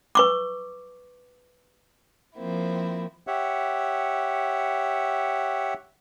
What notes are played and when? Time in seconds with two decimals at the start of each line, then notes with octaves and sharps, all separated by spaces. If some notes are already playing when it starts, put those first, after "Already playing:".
0.15 B4 C#6 D6
2.36 F3 A#3 C4 E4
3.27 G4 C#5 E5 F#5